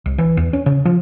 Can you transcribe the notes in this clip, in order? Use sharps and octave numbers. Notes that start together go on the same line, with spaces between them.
C2
E3
E2
C#4
C#3
F3